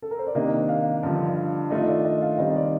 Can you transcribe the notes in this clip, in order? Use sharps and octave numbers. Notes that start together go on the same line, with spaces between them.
A4
A#4
C5
D5
C3 D#3 A#3 D4 D#5
F5
G2 D3 F3 F5
D#3 A3 D4 F4 D#5
D5
D#5
F5
D#3 G3 C4 D#4 D#5
D5